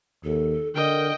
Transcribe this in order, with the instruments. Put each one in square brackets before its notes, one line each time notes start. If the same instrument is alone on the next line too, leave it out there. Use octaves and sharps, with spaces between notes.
[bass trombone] D#2 [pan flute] A4
[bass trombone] D3 [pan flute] A#4 [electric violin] D#5 G5